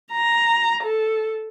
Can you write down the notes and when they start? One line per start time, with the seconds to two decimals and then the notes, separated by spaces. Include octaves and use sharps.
0.12 A#5
0.83 A4